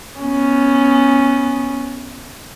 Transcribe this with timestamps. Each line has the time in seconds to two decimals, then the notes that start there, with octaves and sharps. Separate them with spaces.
0.20 B3 C#4